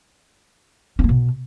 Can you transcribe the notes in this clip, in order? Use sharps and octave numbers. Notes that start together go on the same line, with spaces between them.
C#4
A#3
B2